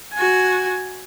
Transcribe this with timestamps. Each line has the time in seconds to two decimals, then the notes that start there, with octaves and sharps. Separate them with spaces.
0.14 F#4 G#5